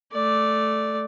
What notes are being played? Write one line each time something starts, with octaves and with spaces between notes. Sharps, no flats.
A3 D5